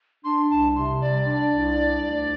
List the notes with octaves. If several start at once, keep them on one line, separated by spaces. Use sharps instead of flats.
D4 C6
C2 A5
C3 C6
G3 D5
D4
C2
D4
D2